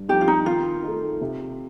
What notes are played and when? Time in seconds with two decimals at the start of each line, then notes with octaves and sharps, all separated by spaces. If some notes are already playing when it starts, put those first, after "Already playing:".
Already playing: G2
0.09 F3 C4 D#4 G4
0.21 F4
0.28 D#4
0.46 D#3 F4
0.83 A3 D#4
1.21 C3